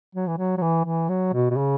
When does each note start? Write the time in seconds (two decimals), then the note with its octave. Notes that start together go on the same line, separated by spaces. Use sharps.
0.15 F#3
0.27 E3
0.38 F#3
0.57 F#3
0.62 E3
0.85 E3
1.09 F#3
1.33 B2
1.51 B2
1.57 C#3